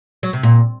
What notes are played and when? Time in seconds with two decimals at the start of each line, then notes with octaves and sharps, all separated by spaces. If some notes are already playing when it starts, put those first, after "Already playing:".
0.23 F#3
0.33 C3
0.43 A#2